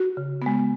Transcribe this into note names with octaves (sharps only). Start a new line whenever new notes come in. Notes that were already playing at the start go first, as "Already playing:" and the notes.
Already playing: F#4
C#3
G#3 B3